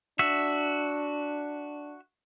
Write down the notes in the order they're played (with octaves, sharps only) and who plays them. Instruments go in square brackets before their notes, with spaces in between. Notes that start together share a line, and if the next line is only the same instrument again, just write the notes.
[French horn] D4 [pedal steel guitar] F#4 E5